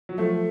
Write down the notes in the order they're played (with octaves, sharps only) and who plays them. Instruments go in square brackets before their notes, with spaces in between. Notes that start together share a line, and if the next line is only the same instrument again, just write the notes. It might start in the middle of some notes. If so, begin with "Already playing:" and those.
[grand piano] F#3
[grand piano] F3 A3 [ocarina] A4